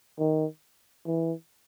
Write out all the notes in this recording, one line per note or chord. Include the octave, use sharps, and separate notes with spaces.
D#3
E3